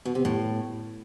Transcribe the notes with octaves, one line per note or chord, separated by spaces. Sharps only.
B2
C3
A2